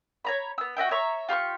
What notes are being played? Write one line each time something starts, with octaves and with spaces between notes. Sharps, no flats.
C#5 A#5 B5
B3 E6
F#4 D#5 E5 G5
C#5 E5 A#5 C#6
F4 G4 C6 C#6